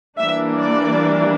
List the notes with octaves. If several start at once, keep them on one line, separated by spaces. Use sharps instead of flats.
E3 G3 A#3 D4 E5
D5